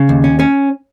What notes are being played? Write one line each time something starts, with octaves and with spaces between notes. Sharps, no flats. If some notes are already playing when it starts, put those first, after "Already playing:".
Already playing: C#3
D#2
C#4
C#4